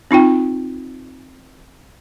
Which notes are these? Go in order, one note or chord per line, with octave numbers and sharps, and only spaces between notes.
C4 D#4 F4 G5